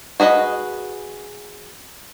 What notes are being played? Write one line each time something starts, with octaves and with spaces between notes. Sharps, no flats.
F#4 G#4 B4 D#5